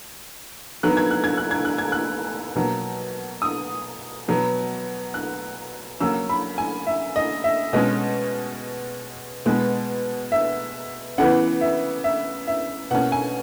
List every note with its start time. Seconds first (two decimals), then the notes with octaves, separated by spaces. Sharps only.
0.83 D#3 F#3 B3 F#6
0.97 G#6
1.11 F#6
1.24 G#6
1.37 F#6
1.51 G#6
1.65 F#6
1.78 G#6
1.92 F#6
2.55 B2 F#3 A#3
3.42 D#6
4.28 B2 F#3 B3
5.14 F#6
6.00 C#3 F#3 A#3 C#4 E6
6.29 B5
6.58 G#5
6.87 E5
7.16 D#5
7.44 E5
7.73 B2 G#3 C#4 D#5
9.46 B2 G#3 B3
10.32 E5
11.18 C#3 E3 B3 F#5
11.61 E5
12.04 E5
12.47 E5
12.91 B2 A#3 C#4 F#5
13.12 G#5